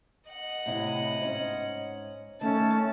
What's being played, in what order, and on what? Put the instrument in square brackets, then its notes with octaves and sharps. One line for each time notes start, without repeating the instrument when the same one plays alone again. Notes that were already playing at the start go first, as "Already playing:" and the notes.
[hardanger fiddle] D#5 F#5
[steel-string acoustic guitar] A2 C3 E4
G#2 C#4
[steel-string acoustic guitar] D#3 [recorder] A3 [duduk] C#4 [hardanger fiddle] A5